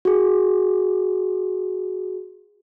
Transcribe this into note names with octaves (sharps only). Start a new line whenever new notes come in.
F#4 G#4